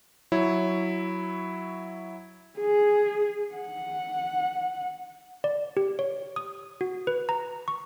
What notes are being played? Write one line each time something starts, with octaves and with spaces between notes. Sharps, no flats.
F#3 E4 C#5
G#4
F#5
D5
G4
C#5
D#6
F#4
B4
A#5
C#6